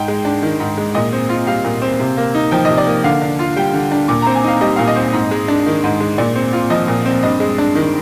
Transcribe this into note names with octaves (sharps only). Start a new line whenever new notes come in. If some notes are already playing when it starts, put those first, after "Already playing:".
Already playing: G#2 G5
G#3
D4
D#3
G#2
G#3
A#2 D#5
C4
F4
G3 F5
A#2
C4
C3
A#3
D#4
F3 G5
C3 D#5
D5
A#3
D3 F5
D4
F4
G3 G5
D3
D4
A#2 D6
A#5
C4
G#5
D#4 F5
G3 D#5
A#2 F5
D#5
C4
G#2
G#3
D4
D#3
G#2
G#3
A#2 D5
C4
F4
F3 D#5
A#2
C4
G2 D#5
G#3
D4
D#3